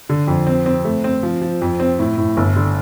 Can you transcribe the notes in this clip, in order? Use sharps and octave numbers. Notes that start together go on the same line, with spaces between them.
D3
F2
C4
C4
A3
C4
F3
F3
F2
C4
A2
A2
G1
D3